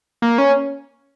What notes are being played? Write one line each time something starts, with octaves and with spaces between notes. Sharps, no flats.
A#3
C#4